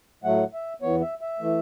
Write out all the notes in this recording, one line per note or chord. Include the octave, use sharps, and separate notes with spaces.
A2 F#3 A3 F#5
E5
E2 E3 B3 C#5
E5
E5
E3 A3